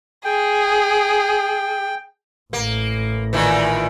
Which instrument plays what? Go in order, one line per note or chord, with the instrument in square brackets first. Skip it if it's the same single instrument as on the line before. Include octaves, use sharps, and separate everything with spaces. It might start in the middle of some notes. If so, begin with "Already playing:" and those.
[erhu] G#4 [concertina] G5
[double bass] A1 [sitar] A#3
[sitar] A#2 D#3 E3